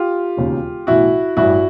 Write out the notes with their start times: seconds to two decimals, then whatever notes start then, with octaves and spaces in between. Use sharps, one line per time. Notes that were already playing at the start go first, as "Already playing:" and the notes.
Already playing: F4 G4
0.37 E1 D#2 C#3
0.87 B1 A2 E3 E4 F#4
1.37 A1 G2 E3 E4 F#4